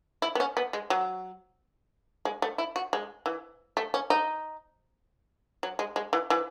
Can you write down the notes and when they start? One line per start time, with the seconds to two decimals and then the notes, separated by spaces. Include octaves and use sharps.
0.22 E4
0.35 B3
0.40 C#4
0.57 B3
0.73 G#3
0.90 F#3
2.25 G#3
2.42 A3
2.58 E4
2.76 F#4
2.93 G#3
3.26 E3
3.77 A3
3.94 C#4
4.10 D#4
5.63 F#3
5.79 G#3
5.96 G#3
6.13 E3
6.30 E3